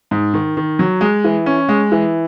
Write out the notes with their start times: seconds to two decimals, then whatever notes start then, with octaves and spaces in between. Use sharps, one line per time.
0.11 G#2
0.34 D#3
0.57 D#3
0.79 F#3
1.01 G#3
1.24 E3
1.46 C#4
1.69 G#3
1.92 E3